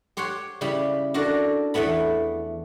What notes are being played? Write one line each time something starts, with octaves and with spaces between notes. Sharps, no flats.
G4 C5 C#5 F#5 G5
C#3 G3 E4 G4 B5
D4 F#4 A4 A#4
E2 E3 A3 B3 B5